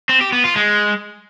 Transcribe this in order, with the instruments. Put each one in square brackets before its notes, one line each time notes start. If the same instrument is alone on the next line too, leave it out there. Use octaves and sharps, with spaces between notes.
[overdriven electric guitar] C4
G4
B3
F4
G#3